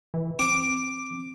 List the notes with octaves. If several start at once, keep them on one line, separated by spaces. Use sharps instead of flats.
E3
C4 D6